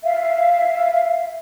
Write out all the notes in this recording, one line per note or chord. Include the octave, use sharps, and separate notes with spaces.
E5 F5